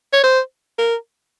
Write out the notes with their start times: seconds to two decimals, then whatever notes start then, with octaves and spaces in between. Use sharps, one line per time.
0.13 C#5
0.23 C5
0.78 A#4